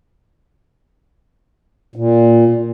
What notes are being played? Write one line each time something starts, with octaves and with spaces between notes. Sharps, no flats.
A#2